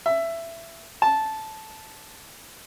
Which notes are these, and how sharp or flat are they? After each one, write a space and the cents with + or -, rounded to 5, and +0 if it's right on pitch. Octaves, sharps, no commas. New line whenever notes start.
E5 +15
A5 -10